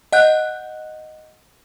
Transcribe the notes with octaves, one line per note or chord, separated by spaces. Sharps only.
D#5 F#5 F#6 G6